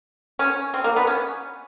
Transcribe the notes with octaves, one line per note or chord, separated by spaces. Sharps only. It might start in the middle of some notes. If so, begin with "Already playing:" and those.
C#4
C4
A#3
B3
C#4